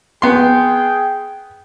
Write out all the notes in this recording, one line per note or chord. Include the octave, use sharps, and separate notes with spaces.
B3 G#4 G5 C6